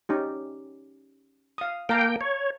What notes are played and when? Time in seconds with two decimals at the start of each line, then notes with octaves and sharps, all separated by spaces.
0.09 C#4 D#4 G4
1.58 F5 D#6
1.89 A#3 F5 G5 A5 A#5
2.21 C#5